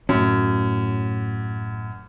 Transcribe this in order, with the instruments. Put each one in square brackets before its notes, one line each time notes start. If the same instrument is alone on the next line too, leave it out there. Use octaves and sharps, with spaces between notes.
[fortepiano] F#2 [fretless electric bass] A2 C#4